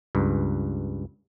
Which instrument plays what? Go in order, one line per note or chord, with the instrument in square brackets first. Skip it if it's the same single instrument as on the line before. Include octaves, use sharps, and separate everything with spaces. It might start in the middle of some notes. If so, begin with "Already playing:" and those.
[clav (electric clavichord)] C#2 G2